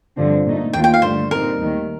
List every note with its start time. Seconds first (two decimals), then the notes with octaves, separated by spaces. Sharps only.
0.17 G2 D3 F3 C4
0.45 A#2 A3 D#4
0.73 D#2 D#3 A#3 F4 G5
0.84 G5
0.94 F5
1.02 G2 D3 A3 C5
1.31 A#2 G3 C4 D#4 A#4
1.59 D#2 D#3 A3